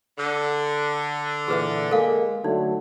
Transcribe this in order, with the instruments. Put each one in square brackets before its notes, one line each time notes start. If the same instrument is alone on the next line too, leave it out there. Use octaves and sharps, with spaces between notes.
[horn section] D3
[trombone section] A#2 E3 [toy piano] G#4 B4 E5
[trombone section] G#3 A#3 G#4 [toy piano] A4 F5
[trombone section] D3 F#3 A3 [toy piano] D#4